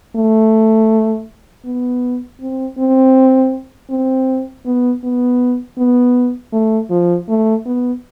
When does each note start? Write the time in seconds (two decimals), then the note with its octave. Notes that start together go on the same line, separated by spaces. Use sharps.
0.16 A3
1.65 B3
2.41 C4
2.78 C4
3.90 C4
4.66 B3
5.04 B3
5.78 B3
6.53 A3
6.91 F3
7.29 A3
7.66 B3